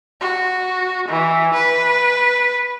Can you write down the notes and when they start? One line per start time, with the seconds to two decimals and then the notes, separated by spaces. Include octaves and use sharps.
0.21 F#4
1.08 E3
1.53 B4